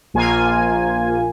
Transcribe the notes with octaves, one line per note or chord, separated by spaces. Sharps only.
A#1 A#3 F4 G#5